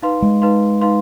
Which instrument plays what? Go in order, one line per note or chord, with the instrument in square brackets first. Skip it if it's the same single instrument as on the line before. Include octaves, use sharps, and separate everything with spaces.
[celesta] D#4 B4 F5 C6
[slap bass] G#3
[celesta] D#4 B4 F5 C6
D#4 B4 F5 C6